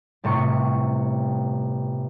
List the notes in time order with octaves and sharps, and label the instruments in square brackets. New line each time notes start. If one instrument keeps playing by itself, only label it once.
[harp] G1 A2 C3 C#6